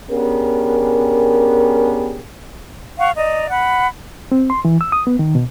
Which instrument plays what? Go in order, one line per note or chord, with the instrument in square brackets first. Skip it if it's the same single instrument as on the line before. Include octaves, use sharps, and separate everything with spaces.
[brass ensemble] B3 C#4 D4 G4 G#4 A#4
[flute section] F5 F#5 C#6
D5 D#5 A#5
F#5 B5
[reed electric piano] C4
C6
E3
E6
D#6
B3
D#3
B2